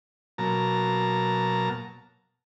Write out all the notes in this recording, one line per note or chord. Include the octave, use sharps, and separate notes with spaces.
B2 F#3 A#3 A5 A#5